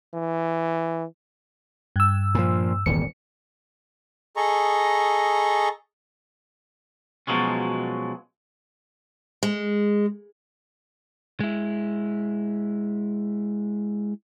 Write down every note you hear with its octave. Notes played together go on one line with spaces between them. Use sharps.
E3
G2 E6
A#2 F3
D#1 G#1 E2 C#7
G#4 A4 D#5 A#5 C#6
B2 F3 F#3 G#3 C#4
G#3
G#3 E4